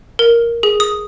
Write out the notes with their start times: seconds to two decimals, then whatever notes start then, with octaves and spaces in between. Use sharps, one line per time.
0.19 A#4
0.63 G#4
0.80 D#6